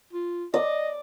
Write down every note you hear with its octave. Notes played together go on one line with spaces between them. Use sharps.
F4
D5 D#5